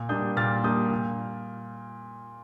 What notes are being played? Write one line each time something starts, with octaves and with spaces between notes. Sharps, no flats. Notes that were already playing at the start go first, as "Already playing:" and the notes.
Already playing: A#2
G3 A#3 D4 D#6 G6
A#2 F6 A6
G3 A#3 D4 D#6 G6
A#2